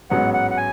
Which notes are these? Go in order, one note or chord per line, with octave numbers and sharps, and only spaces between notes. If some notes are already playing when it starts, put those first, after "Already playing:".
A1 G#2 F#3 B3 F#5
F#5
F#5
G#5